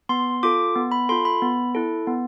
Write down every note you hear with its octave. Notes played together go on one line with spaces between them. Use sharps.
B3 C6
F4 A4 D6
B3
B5
F4 A4 C6
B5
B3
E4 A4
B3